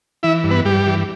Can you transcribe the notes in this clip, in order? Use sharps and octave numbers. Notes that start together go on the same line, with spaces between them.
E3 E4 E5
G2
B3 B4
G2 G3 G4
E3